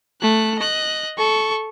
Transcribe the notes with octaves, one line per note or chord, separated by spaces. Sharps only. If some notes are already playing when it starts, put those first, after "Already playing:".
A3 F#6
D#5 F#6
A4 C#6